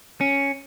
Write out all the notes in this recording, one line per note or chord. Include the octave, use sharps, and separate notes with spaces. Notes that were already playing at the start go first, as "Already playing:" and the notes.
C#4